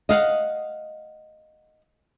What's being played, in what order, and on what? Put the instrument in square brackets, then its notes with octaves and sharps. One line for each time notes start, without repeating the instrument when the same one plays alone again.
[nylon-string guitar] D#5 F5 F#5